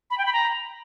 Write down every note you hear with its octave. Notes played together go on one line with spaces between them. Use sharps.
B5
G5
B5
A#5